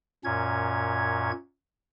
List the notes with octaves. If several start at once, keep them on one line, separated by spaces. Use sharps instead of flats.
F#2 A#2 C#4 G#6